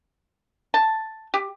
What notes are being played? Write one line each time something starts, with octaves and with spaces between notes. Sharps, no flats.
A5
G4